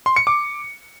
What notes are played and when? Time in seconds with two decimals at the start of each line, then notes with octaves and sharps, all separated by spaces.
0.06 C6
0.16 C#7
0.27 D6